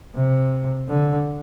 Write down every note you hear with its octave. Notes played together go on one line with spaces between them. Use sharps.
C3
D3